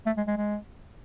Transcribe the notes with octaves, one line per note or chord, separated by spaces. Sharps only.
A3
G#3
G#3
G#3